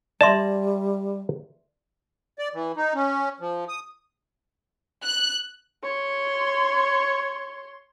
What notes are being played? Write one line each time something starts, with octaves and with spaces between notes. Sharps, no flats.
G3 D5 E5 A5 C6
D5
E3
D#4
C#4
F3
D#6
F#6
C#5 C6